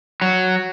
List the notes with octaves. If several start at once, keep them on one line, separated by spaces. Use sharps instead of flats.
F#3